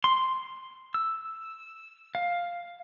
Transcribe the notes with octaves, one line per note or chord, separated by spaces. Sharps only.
C6
E6
F5